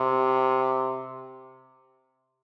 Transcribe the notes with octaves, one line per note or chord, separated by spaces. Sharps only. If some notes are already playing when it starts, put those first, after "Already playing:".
Already playing: C3